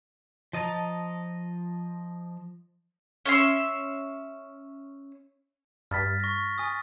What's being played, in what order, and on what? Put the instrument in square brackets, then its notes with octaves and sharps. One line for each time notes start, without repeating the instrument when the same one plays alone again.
[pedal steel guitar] F3 D#5 A5 A#5
[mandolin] C#4 E5 C6
[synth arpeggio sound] G2 [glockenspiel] F6 A6 B6
[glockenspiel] C#6 A#6
G#5 D#6 A6